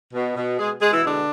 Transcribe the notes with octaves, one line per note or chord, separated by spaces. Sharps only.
B2
B2
B2 G#3 G#4
B2 G#3 G#4
E3 E4
D3 G#3 D4